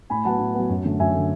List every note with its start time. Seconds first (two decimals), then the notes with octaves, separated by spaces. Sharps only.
0.10 A2 G#5 B5
0.25 F#3 B3 F#5 A5
0.39 A2
0.55 F#3 B3
0.69 F#2
0.85 D3 A3
0.99 F#2 E5 G#5
1.14 A3
1.19 D3